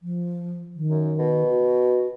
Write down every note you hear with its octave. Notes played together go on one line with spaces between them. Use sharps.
F3
D#3
F#2
B2
F#4